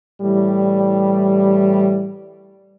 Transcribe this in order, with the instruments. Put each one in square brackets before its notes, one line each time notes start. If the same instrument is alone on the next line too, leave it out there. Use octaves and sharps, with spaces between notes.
[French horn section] A2 E3 G3